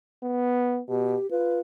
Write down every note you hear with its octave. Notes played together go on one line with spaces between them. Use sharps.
B3
B2 G4
F4 B4